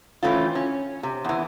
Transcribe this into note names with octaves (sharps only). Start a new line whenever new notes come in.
E3 A3 C4 C#4 F4
C#4
C3
E2 E3